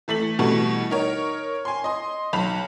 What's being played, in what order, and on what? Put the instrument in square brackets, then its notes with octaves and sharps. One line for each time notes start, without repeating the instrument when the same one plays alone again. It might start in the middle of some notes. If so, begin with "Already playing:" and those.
[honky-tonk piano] E3 A3 B6 F#7
B2 E3 G3 A3
D#4 A#4 C#5
G#5 C6
D#5 C6
B1 B5 F7